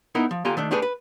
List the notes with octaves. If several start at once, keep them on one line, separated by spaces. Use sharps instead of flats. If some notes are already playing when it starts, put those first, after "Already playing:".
B3 D#4 E4 A#4
F3
D3 A#3 F4 G4 G#5 A#5
D#3 A3 D4
A3 D4 G4 G#4 B4
B4